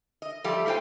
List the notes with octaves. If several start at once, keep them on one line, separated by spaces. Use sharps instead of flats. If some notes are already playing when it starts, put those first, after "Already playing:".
D#5
F3 G3 A3 G4 A4
A3 F4 B4 C5 G5